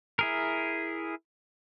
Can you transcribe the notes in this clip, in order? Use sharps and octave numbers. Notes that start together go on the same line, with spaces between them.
E4 G#4 A#4